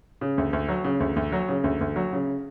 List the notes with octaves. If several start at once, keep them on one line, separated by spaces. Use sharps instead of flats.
C#3
D2
D2
F#3
C#3
D2
D2
F#3
C#3
D2
D2
F#3
C#3